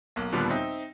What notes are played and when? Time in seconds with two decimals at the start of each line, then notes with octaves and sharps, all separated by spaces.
0.16 B1 A#3
0.32 D#2 A#2 D3 F3 G3 B3
0.50 C4 D#4 E5 G5